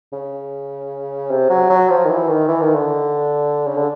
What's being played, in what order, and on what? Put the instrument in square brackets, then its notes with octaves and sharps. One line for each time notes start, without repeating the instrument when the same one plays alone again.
[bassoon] C#3
C3
F#3
F#3
F3
D#3
E3
D#3
E3
D#3
D3
C#3
D3